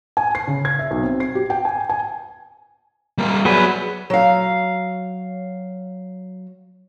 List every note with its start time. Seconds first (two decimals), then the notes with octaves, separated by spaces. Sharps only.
0.17 G#5
0.35 C7
0.47 C#3
0.65 G#6
0.79 E5
0.91 B1
1.03 C4
1.20 C7
1.35 G4
1.50 G5
1.65 G#5
1.90 G#5
3.18 G3 A#3
3.45 F#3 G#4 B4 D5
4.10 F#3 F5